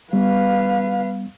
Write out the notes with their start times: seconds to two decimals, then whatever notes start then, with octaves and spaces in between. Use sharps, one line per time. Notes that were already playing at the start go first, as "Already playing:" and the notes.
0.13 G3 B3 B4 F5